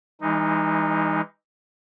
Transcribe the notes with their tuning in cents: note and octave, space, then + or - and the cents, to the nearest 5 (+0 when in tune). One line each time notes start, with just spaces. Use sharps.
E3 +0 G#3 -40 D#4 +0